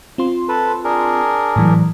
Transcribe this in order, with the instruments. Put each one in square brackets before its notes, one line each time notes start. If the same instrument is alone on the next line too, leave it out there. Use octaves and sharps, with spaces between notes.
[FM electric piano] C4 F4 C6
[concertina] A4 B4
D4 G#4 A#4
[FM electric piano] A2 E3 F#3